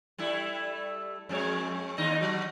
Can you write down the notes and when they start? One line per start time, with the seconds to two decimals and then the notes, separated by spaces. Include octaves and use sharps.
0.18 G3 A3 E4
1.29 F2 G#3 C#5
1.98 D#2 D#4 D#5
2.21 F#3 F#4